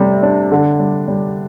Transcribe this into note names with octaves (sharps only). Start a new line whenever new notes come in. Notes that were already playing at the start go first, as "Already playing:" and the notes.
Already playing: C3 G3 A3
D4
D3
G3
G3